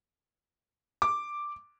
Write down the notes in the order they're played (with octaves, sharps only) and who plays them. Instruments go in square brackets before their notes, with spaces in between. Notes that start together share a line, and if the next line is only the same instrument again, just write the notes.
[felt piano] D6